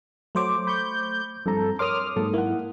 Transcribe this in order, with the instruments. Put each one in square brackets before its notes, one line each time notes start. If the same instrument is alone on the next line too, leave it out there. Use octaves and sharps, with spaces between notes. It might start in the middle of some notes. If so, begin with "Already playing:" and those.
[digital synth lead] F#3 [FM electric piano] A3 C5 D6
[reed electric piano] B5 C#6 [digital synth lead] G6
[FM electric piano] G2 [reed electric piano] F3 C4 A#5 [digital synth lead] A4
[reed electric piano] A#4 C#5 C6 [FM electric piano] D6 D#6 [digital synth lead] F6
[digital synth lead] G#2 [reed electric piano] F#3 A#3 A4
[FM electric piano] A#3 [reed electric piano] E4 F#5